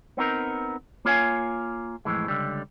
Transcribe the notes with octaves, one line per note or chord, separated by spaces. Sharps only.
B3 C4 D#4 A#4
A#3 F4 C#5 F5 G#5
F2 A2 E3 G#3
C#2 D3 G3